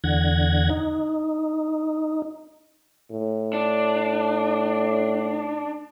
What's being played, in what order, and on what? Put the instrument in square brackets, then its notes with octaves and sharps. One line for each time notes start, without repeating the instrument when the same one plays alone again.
[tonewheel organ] E2 D3 F#5 G#6 A#6
D#4
[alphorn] A2
[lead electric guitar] D4